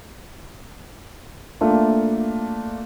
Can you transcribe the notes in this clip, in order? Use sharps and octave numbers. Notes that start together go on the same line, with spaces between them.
A3 A#3 D4 F4